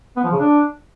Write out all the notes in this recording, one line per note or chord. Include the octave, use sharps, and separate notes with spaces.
B3
F3
C#3
D4